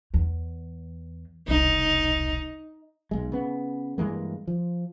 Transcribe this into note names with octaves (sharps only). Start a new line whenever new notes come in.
E2
E1 C2 D#4
B1 G#3
C#3 B3
G2 E3 G#3 A#3
F3